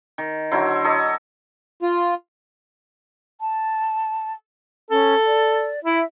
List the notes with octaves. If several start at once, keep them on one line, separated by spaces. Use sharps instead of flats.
D#3
D3 F#3 E4 C5
A4 C#5 D#5
F4
A5
C#4 A4
D5
E4 E5